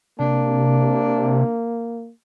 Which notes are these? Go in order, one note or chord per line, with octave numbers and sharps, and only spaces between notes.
C3 A#3 D4